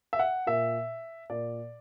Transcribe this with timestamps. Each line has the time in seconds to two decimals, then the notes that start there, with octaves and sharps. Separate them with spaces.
0.13 E5
0.19 F#5
0.47 A#2 E5
1.30 A#2 D5